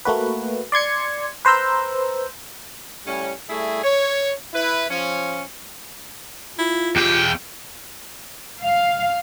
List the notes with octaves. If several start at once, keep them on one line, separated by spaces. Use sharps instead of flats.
A3 A#3 F#4 B4
D5 C6 G#6 C#7
B4 C5 A#5 E6 G6
A2 G3 C#4
G3 A3 E4 G#4
C#5
E4 B4
F3 C#4
E4 F4
E2 G4 G5
F5